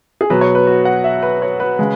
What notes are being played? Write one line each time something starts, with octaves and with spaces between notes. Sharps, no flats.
G#4
B2 F#3 B4
C#5
B4
F#4
F#5
E5
B4
C#5
B4
C#3 G#3